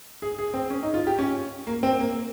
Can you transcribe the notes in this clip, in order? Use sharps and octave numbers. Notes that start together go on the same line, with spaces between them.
G#4
G#4
C4
C#4
D#4
F4
G4
C#4
A#3
C4
A#3